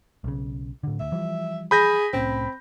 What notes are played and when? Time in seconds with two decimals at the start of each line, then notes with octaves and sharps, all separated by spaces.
0.24 B1 C#3
0.83 A2 D3
1.00 D2 E5
1.12 E3 F3 G3
1.71 G#4 B5 G6 A#6
2.14 C2 A2 C4 C#4